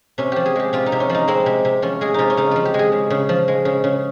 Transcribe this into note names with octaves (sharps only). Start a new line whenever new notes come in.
C3 C#4
F3 G4
G#4
G#3 G4
C3 F4
D#4
C3
C#4
F3
D#4
G#3 C4
C3
C3
F3 C#4
G#3 G#4
C3 D#4 F4
C#4
C#3 D#4
F3 F4
G4
G#3
G#4
C#3
C#3
F3
G#3
C#3
C#3